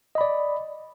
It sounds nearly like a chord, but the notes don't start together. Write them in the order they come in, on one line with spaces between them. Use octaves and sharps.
D#5 B5 D5